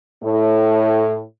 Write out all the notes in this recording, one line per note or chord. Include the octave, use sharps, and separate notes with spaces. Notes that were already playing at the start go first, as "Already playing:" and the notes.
A2